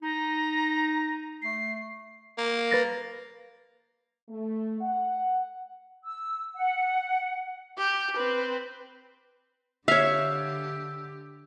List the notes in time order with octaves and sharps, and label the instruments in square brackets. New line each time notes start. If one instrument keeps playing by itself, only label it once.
[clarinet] D#4 [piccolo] A#5
[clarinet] A3 [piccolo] C7
[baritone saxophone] A#3
[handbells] B4 A6 A#6
[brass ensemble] A3
F#5
[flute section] E6
F#5
[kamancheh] G4
C4 B4
[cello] D3 G4 [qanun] C#5 F5 [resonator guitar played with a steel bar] E5 [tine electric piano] E6